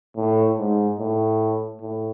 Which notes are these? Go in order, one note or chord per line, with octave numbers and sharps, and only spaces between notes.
A2
G#2
A2
A2